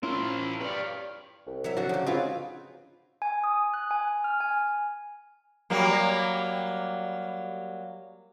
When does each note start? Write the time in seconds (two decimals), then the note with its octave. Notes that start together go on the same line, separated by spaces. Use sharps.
0.03 C#4 E4 F4 A#4 C5
0.60 G4 B4 C#5 D5 F5
1.47 C2
1.64 F#3 E5
1.77 D3 F3 F#4
1.89 C#3 F#3 G4
2.06 G#2 C4 D#4 F4 G#4 B4
3.22 G#5
3.44 D#6
3.74 F#6
3.91 G#5
4.24 F6
4.40 G#5
5.70 F#3 G3 A#3